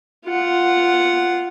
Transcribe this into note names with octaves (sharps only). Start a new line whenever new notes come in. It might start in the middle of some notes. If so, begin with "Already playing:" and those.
F4 F#5